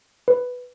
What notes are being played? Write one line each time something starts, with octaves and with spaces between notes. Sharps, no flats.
B4